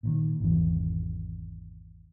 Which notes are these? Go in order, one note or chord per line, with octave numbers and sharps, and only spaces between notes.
A#2 D3 D#3
G#1 E2 C3 E3